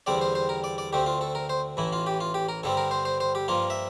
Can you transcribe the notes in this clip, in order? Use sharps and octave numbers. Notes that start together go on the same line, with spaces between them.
E2 D3 G3 C4 D5
C5
C5
A#4
D5
D5
D2 D3 A3 C4 G4
F4
A4
A#4
C5
A1 A2 E3 E4
F4
G4
F4
G4
A#4
G2 D3 G3 C4 A4
A#4
C5
C5
C5
G4
G2 F3 A#3 F4
E5